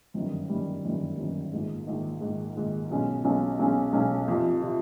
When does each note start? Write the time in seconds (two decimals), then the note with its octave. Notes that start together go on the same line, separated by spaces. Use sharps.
0.14 G1 F#2 D#3 G3
0.50 G1 F#2 D#3 G3
0.83 G1 F#2 D#3 G3
1.17 G1 F#2 D#3 G3
1.52 A#1 G#2 D#3
1.87 A#1 G#2 D#3
2.21 A#1 G#2 D#3
2.56 A#1 G#2 D#3
2.90 B1 B2 G#3 C#4
3.24 B1 B2 G#3 C#4
3.59 B1 B2 G#3 C#4
3.93 B1 B2 G#3 C#4
4.28 F2 C3 F3
4.62 C3 F3